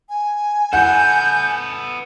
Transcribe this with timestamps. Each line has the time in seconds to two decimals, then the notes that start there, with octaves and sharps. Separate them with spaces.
0.09 G#5
0.73 B3 A4 F#5 G6